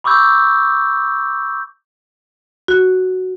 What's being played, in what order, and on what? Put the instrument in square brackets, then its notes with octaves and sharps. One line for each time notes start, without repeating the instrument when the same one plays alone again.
[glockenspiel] B5 C#6 D6 E6 G6
[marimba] F#4